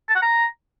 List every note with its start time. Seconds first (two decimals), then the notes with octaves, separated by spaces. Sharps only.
0.09 A5
0.16 F#5
0.23 A#5